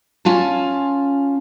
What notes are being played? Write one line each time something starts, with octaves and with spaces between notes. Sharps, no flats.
C#4 F4 G#5 A5